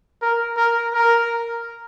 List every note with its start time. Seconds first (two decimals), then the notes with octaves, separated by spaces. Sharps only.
0.22 A#4
0.57 A#4
0.93 A#4